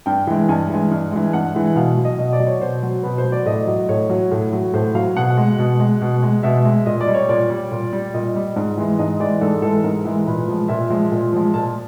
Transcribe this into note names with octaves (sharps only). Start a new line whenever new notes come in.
G2 G5
E3 G#3
G2 G#5
E3 G#3
G2
E3 G#3
G2 F#5
E3 G#3
B2 F5
F#3
D#5
B2 D#5
D5
F#3
C#5
B2 C5
F#3
B2 B4
C5
F#3
D5
A2 D#5
F#3
A2 C#5
F#3
A2
F#3
A2 C5
F#3 F5
B2 F#5
G#3
B2
G#3
B2
G#3
B2 E5
G#3
A#2 D#5
D5
G3
C#5
A#2 D5
G3
A#2
G3
A#2 D#5
G3
G#2
E3 G#3
G#2 D#5
E3 G#3 D5
G#2 A4
E3 G#3 A4
G#2 A#4
E3 G#3
A#2 B4
F3 G#3
A#2 E5
F3 G#3
A#2
F3 G#3
A#2 A5